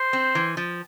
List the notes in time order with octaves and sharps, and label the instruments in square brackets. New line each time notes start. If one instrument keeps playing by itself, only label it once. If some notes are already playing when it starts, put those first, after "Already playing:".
Already playing: [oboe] C5
[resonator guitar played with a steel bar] C4
E3
F3